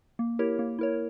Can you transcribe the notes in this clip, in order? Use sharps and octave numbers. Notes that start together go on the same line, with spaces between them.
A#3
E4 G4 A#4 C#5
A#3
E4 A#4 C#5